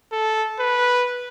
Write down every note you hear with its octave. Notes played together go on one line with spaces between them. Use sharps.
A4
B4